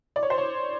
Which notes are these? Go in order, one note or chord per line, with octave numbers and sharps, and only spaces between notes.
D5
C#5
C5
C#5